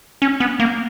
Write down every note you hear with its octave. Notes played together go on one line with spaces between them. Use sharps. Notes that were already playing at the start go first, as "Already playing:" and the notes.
C#4
B3
A#3